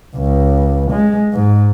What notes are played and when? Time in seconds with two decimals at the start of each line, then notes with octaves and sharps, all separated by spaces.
0.16 C#2
0.92 G#3
1.33 G#2